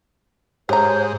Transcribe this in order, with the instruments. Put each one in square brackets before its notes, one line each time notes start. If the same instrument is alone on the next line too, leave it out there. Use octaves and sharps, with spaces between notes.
[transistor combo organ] G#2 [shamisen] G4 A#5 [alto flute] C5 [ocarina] C#5